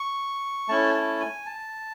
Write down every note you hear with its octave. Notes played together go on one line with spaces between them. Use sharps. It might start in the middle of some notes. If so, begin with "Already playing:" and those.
Already playing: C#6
A3 C#4 E4 A5
A5
G#5
A5